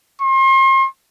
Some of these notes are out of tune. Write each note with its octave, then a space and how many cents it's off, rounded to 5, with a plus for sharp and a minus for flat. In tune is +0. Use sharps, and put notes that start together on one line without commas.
C6 +40